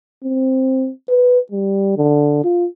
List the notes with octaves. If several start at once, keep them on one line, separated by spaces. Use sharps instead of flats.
C4
B4
G3
D3
F4